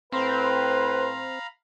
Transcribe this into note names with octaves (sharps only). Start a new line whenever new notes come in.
A2 C4 B4 C5 F5 A#5 B5